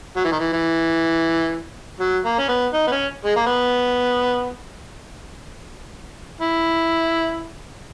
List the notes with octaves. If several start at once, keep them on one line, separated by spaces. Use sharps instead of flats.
F#3
E3
D#3
E3
E3
F#3
A#3
C#4
B3
D#4
B3
C#4
G#3
A#3
B3
E4